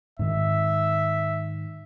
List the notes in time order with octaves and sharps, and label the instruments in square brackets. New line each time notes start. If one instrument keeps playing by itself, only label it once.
[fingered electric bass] G#2 D#3 [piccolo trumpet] E5